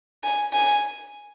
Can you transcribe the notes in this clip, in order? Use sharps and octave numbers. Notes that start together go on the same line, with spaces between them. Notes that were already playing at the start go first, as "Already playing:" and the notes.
G#5
G#5